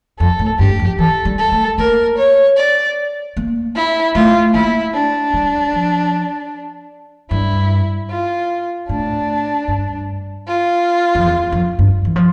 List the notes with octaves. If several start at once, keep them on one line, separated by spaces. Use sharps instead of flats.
F2 A4
A2
G2 G4
F2
E3 A4
G3
A4
A3
A#3 A#4
C#5
D5
A#3
E4
A3 F4
A#3 E4
D4
G3
F3
G2 E4
F4
A2 D4
G2
F4
F2
E2
F2
G2
E3
F3